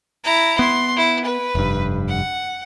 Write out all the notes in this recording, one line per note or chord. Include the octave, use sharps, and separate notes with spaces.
E4 A#5
B3 C6
E4
B4
F1 G2
F#5